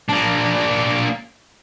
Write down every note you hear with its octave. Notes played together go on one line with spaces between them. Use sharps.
A#3 D4